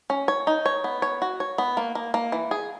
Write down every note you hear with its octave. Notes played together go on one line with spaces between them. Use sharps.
C#4
C#5
D#4
C#5
B3
C#5
F#4
C#5
B3
A#3
A#3
A#3
E3
G#4